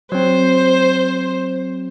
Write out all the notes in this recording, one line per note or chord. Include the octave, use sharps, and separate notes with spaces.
F#3 C4 C5